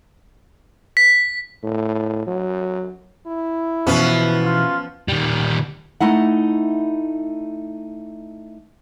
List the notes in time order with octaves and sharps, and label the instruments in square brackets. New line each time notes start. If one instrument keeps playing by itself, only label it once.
[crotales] B6
[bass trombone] A2
F#3
[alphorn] E4
[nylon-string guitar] B2 E3 [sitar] F3 B3 C#4
[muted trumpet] F4
[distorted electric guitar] D#3 G3
[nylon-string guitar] A3 D#4 E4 F#5